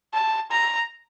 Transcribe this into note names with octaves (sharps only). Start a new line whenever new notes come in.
A5
A#5